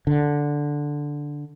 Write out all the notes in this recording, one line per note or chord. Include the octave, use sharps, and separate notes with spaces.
D3